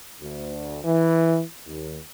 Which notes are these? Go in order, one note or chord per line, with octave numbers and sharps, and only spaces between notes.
D2
E3
D#2